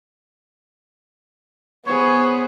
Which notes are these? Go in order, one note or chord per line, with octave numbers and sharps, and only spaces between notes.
B3 G#4 C5 C#5